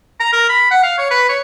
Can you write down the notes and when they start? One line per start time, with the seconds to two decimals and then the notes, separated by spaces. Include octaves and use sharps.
0.20 A#5
0.33 A#4
0.49 B5
0.71 F#5
0.83 F5
0.98 C#5
1.11 B4
1.29 C#5